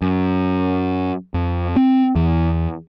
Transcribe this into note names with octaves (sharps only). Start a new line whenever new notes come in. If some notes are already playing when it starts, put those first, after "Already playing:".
F#2
F2
C4
E2